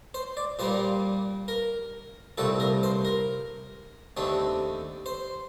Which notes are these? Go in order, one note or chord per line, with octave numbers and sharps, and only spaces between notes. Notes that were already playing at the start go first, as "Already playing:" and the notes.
C5
D5
A#2 G3 A#3 C5
A#4
C2 A#2 A3 C4 A4
A#4
C5
A#4
D#2 D3 A3 C4
C5